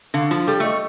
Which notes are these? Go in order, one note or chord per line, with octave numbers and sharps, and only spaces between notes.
D3 F5
F3 F4
G3 A4
A3 D#5